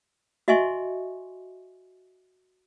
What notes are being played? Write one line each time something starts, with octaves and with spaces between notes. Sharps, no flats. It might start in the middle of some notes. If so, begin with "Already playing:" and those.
F#4 D#5 E5 G#5 C6 C#6